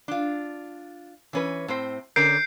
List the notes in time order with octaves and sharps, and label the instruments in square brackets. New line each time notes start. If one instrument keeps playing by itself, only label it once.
[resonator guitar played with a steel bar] D4 F4
E3 C#4 B4
A2 C4 C5
[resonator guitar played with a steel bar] D3 C#4 A#4 [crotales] G6 C7 D7